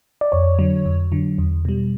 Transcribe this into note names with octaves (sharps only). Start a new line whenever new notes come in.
D5
F2 C#5
D3 F#3
F2
D3 F#3
E2
B2 G3